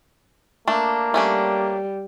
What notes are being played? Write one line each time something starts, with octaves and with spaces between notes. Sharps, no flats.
A3 A#3 D4
G3 A3 C#4 D4